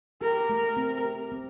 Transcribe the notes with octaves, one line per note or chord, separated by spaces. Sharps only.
G4 A#4
A3
C4
G4
C4